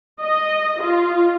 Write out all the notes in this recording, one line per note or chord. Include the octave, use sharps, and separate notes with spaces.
D#5
F4